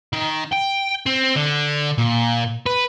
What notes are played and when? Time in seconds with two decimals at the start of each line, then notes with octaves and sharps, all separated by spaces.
0.13 D#3
0.53 G5
1.06 C4
1.35 D3
1.98 A#2
2.66 B4